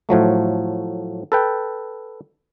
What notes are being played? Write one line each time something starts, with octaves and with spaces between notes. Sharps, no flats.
A2 F3 F#3 A3
A4 B4 G5